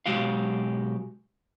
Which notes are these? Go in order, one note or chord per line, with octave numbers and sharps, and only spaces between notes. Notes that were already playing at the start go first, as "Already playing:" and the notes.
B1 A2 G#3 F#4 G4 F5